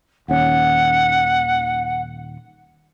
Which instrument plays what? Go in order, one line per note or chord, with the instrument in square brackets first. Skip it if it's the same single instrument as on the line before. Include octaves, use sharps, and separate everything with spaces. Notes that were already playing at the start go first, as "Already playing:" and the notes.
[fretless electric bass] D#1 D#2 C#4 [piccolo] F#5